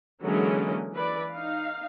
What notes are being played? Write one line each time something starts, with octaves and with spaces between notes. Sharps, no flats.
D3 E3 F#3 G#3 A#3 C#4
E3 B4 D5
D#4 F5